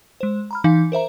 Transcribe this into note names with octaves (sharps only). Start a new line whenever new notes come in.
G#3 C5
A#5 B5 F6
E3 D#4 F5
A#4 C5 E5 A#5